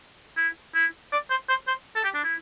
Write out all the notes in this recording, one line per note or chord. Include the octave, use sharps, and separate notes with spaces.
E4
E4
D5
C5
C5
C5
A4
G4
D4
E4